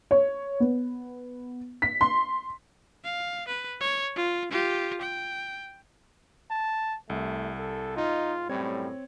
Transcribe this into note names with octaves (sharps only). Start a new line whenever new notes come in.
C#5
B3
B6
C6
F5
B4
C#5
F4
F4 G4
G5
A5
C2 A3
A4
G#2 D#4 F4
F#2 A2 G3 C4 C#5 G#6